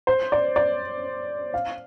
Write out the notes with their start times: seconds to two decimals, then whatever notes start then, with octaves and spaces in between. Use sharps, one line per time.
0.07 C5
0.32 D5
0.56 D5
1.54 F5